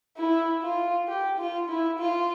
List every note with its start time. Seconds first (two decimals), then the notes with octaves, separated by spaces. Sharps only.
0.17 E4
0.63 F4
1.08 G4
1.38 F4
1.69 E4
1.99 F4